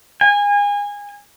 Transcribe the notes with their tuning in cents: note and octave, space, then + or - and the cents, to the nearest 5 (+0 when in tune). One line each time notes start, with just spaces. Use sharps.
G#5 -25